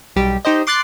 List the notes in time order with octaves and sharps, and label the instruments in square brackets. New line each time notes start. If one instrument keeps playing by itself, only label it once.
[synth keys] B1 G3 G4
D#4 G4 C5 D#5
C6 D6 F#6 A6 C7